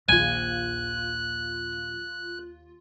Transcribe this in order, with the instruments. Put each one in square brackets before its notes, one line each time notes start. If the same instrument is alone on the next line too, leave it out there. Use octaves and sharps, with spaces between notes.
[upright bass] A#1 [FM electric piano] D#2 F4 [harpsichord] G#5 [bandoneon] F#6